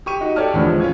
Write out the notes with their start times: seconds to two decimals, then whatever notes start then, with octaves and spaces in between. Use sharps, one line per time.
0.06 G4 C#6 D#7
0.21 D#4 F#4
0.36 G4 A4 C#5 D5 A5 F6
0.54 E2 A2 D3 F3
0.66 F3 G#3
0.80 C#4 F4 G#6